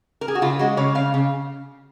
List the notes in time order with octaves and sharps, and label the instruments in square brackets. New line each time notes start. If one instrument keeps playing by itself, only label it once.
[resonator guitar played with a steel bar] A#4
G#4
F#4
C#3 F4
G#3 F#4
C#3 C#5
C#3 F5
C#3